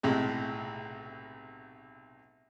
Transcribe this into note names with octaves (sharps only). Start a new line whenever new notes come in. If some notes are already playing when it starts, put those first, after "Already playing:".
B1 A2 C3 G#3